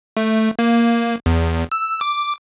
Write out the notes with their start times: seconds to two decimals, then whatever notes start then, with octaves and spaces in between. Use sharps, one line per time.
0.17 A3
0.59 A#3
1.26 E2
1.72 E6
2.01 D6